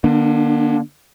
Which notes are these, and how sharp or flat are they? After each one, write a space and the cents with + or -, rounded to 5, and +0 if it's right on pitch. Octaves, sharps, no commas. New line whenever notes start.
D3 +45 A#3 +40 D4 -5